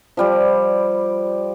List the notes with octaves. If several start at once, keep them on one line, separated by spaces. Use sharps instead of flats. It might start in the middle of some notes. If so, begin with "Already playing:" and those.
F3 G3 D5